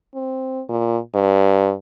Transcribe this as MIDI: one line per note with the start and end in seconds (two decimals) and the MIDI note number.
0.15 0.62 60
0.69 0.98 46
1.14 1.73 43